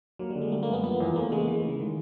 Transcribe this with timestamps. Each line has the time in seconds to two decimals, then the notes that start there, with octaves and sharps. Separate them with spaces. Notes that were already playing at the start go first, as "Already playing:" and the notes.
0.19 F#3 A#3
0.30 G3
0.36 D3
0.42 G#3
0.52 G3 A3
0.63 A#3
0.68 F#2
0.73 B3
0.84 F3 B3
1.00 E2
1.16 A3 A#3
1.31 C#3 G#3
1.47 E3 A3
1.64 C#3
1.80 D#3 G#3